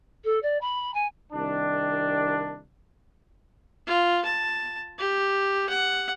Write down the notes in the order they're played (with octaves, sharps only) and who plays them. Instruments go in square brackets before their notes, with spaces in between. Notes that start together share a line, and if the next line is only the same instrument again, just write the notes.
[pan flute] A4
D5
B5
G#5
[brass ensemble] C2 D#3 D4
[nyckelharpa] F4
A5
G4
F#5